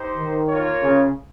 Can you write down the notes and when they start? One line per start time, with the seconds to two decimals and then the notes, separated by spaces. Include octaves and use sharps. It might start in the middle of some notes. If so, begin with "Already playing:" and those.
Already playing: D#4 G4 C5
0.17 D#3
0.49 A#3 F4 A#4 C#5
0.82 C#3